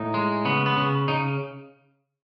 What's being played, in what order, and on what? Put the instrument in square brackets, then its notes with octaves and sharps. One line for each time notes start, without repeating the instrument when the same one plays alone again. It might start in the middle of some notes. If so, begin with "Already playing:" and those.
Already playing: [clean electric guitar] A2 D#4
G#3
C#3 B3
B3
C#3
C#3 D#4